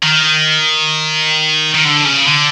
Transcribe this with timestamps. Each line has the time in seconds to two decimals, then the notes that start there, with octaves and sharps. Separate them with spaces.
0.03 D#3
1.75 D#3
1.85 D3
2.05 C#3
2.26 D3